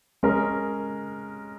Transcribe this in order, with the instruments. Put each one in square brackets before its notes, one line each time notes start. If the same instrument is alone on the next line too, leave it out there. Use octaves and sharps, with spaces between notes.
[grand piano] G#3 C#4 A#4